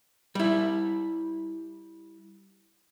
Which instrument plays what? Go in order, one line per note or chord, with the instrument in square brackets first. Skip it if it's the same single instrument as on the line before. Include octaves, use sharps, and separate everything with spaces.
[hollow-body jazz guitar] G3 E4